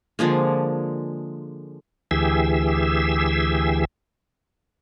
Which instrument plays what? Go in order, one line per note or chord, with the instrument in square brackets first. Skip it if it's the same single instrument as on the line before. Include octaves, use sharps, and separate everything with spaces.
[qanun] D3 F3 G#3 A#3
[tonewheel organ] D2 E3 G4 G#4 E6